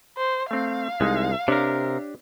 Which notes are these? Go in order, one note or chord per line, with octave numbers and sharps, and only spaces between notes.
C5
A3 C4 F5
C2 G#3 D#4
C3 D4 G4 A#4 C#5